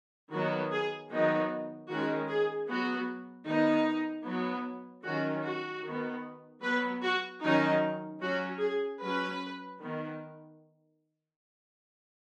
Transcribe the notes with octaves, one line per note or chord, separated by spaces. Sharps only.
D#3 F#3 B3 F#4
G#4
D#3 F#3 B3 D#4
D#3 G#3 C#4 F#4
G#4
F#3 B3 F#4
D#3 B3 D#4
F#3 B3
D#3 F#3 C#4 F#4
F#4
D#3 B3
F#3 B3 B4
F#4
D#3 F#3 C#4 D#4
F#3 C#4 F#4
G#4
F#3 C#4 B4
D#3 B3